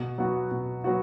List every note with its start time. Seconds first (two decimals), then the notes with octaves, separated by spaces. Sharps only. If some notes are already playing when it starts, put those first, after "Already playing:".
Already playing: B2
0.18 F#3 B3 F#4
0.51 B2
0.84 F#3 B3 F#4